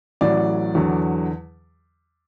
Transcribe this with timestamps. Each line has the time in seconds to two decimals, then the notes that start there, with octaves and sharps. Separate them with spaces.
0.21 A1 A2 F#3 D5
0.75 E2 D3 F#3